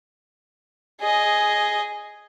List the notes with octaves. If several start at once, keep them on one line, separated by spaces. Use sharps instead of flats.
G#4 D#5